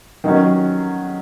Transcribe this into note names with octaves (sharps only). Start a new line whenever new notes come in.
D#3 F#3 C#4